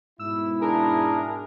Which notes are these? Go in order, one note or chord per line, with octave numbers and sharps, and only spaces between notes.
G#2 B2 E4 E6
D4 G#4 A#4